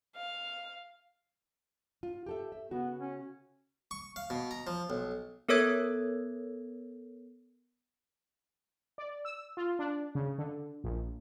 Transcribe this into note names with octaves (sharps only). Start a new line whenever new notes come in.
F5
F4
G4 A4 E5
E5
C#3 B3 F#4
C#4
C#6
F5
B2
A#5
F3
B1
B3 A4 A#4 C#5 E6 G#6
D5
E6
F4
D4
C#3
D3
A#1